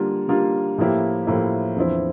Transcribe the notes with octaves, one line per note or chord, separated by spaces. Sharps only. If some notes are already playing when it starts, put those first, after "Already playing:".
Already playing: D3 G3 A#3 F4
D3 G3 A#3 F4
A2 F3 A#3 E4 G4
A2 F3 A#3 E4 G4
E2 D3 F3 C4 E4